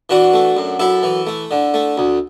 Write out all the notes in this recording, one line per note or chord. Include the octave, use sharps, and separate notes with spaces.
E3 D4 F#4
A3
F#2
F#2 E4 A4
E3
A3
D3
A3
D2